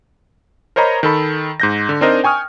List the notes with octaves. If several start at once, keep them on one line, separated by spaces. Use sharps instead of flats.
A#4 C5 C#5 D#5 A#5 B5
D#3 A4 B5
G#2 G6 A#6
D3
C4 D4 D#4 A#4 C5 D#5
G5 G#5 C#6 D#6 F6